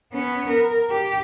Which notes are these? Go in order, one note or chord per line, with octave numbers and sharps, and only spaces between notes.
B3 C#4
A#4
G4